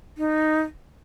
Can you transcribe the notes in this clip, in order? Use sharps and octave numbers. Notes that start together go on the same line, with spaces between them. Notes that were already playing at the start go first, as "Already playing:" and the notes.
D#4